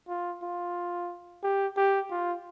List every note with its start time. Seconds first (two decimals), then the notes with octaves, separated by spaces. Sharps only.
0.08 F4
0.42 F4
1.43 G4
1.77 G4
2.11 F4